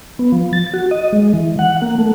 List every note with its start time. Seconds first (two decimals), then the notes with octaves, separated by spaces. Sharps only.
0.19 B3
0.32 F3
0.53 A6
0.74 F#4
0.91 D#5
1.13 G#3
1.34 E3
1.59 F#5
1.82 A#3
1.98 A3